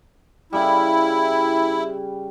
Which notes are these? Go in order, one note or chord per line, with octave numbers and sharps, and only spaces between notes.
C#3 G3 E4